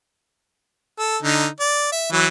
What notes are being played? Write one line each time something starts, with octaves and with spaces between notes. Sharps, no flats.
A4
D3 D#4
D5
E5
E3 F#3